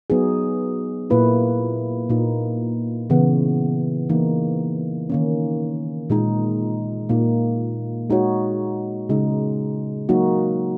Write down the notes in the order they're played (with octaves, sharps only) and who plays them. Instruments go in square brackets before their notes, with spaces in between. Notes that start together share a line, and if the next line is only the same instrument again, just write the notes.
[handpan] F#3 B3 D#4 G#4
A#2 A#3 E4 B4
A#2 A#3 D#4
C#3 E3 B3
E3 A#3 D#4
D#3 A#3 C#4
A#2 G#3 D#4
A#2 A#3 D#4
G#3 D#4 F#4 C#5
C#3 G#3 D#4
F#3 A#3 D#4 F#4